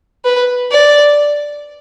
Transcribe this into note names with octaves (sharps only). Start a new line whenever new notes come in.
B4
D5